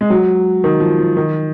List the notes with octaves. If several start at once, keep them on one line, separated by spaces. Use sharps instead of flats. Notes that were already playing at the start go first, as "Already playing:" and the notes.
G#3
F#3
D#3
F3
F3
D#3